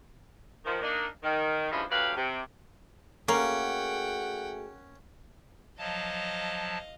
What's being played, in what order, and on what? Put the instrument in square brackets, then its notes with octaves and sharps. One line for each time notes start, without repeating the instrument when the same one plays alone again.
[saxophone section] D#3 F3
A#3 D4 D#4
D#3
G2 C#3 F3 G#3 C#4 E4
D2 F#3 G4 B4 F5
C3
[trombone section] A3 F#4 G#4 [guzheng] A#3 [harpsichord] C#4 [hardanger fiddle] F#5 G5
[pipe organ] F3 F#3 A5 [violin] D#5 F5